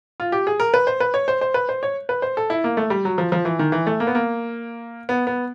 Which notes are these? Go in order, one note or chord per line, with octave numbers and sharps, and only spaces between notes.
F4
G4
G#4
A#4
B4
C5
B4
C#5
C5
C5
B4
C5
C#5
B4
C5
A4
E4
A#3
A3
G3
F#3
F3
F3
E3
D#3
E3
A3
A#3
B3
A#3
B3
B3